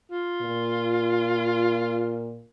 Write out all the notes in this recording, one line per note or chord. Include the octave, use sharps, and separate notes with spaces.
F4
A#2